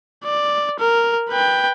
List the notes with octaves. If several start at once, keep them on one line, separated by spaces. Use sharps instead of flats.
D5
A#4
B4 G5